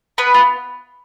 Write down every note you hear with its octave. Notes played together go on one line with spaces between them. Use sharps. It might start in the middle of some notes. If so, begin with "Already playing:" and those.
B3 B4
F4